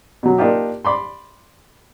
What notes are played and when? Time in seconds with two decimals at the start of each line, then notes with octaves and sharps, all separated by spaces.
0.23 B2 F#3
0.38 A#3 D4 D#4 F4 G4
0.85 D5 B5 C6